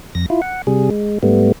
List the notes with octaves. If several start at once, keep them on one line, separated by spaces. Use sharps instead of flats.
F2 A#6
E4 F4
F#5
C3 G3 G#4
G#3
G#2 G3 A3 B3